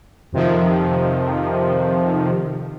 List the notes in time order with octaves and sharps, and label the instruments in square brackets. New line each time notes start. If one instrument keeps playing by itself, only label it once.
[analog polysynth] F2 C3 D#3 F3